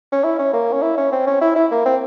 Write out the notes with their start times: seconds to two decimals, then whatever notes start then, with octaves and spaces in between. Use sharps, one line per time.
0.12 C#4
0.24 E4
0.39 C#4
0.53 A#3
0.73 C#4
0.82 E4
0.97 C#4
1.12 C4
1.27 C#4
1.41 E4
1.56 E4
1.71 A#3
1.86 C4